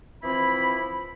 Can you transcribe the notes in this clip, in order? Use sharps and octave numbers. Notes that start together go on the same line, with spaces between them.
E3 F3 C4 E4 B5